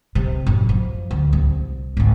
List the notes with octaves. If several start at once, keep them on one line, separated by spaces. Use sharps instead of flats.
C3
A1 F#2
F3
D2
C2
G#1 C#2